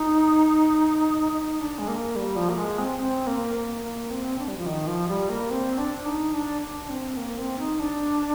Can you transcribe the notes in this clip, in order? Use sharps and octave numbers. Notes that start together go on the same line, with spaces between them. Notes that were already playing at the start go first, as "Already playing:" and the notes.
Already playing: D#4
D#4
D4
G#3
A#3
G3
F3
A#3
G#3
C4
C4
A#3
A#3
A#3
C4
D4
G3
F3
D#3
F3
G3
A#3
C4
D4
D#4
D4
D4
C4
A#3
C4
D#4
D4